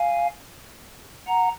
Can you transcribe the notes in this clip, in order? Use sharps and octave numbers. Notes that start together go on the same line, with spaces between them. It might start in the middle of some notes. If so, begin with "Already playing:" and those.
Already playing: F5 G#5
F#5 A#5